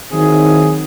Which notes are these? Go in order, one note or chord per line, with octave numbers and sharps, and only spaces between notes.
D#3 F#3 C4 E4 G#4